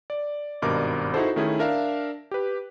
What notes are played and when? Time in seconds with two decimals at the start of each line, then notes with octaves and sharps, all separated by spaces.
0.10 D5
0.62 G#1 G2 B2 A#4 D#5 D6
1.14 D#4 E4 F#4 G#4 A4 C5
1.36 D#3 A3 C#4 E4 G#4
1.59 D4 A#4 E5 F5
2.31 G4 B4